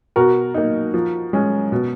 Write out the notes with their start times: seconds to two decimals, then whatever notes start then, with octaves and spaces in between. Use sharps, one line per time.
0.16 B2 F#4 A#4
0.54 A#3 D#4
0.94 F3
1.33 G#3 C#4
1.72 B2